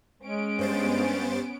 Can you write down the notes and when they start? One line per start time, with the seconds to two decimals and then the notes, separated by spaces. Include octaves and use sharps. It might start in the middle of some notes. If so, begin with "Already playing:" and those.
0.22 G#3 C#4 D7
0.59 G2 B3 C5 A6